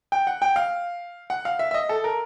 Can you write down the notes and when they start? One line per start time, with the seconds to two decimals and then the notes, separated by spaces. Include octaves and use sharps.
0.12 G5
0.27 F#5
0.42 G5
0.56 F5
1.30 F#5
1.45 F5
1.59 E5
1.71 E5
1.74 D#5
1.89 A4
2.04 A#4